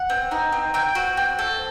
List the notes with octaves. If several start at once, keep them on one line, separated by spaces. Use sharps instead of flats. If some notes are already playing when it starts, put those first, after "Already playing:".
Already playing: F#5
C4
D#4
C4
C4 G5
F#4
C4
A4